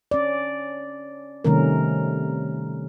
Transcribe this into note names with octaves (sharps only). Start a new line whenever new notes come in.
C#4 D5
C3 D#3 G3 A3 C#4 A#4